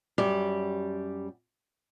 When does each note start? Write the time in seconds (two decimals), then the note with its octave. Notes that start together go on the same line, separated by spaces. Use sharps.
0.18 F#2 G3 G4